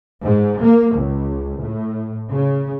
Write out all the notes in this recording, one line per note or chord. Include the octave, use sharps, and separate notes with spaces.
G#2
A#3
C#2
A2
C#3